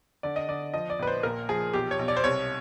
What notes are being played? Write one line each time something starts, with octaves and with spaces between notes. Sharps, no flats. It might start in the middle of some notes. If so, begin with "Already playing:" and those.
D3 D5
D#5
D3 D5
F3 D#5
D5
A#1 B4
C5
A#2 A#4
F3 G#4
B1 G4
C#5
B1
D5
C5
C2 C#5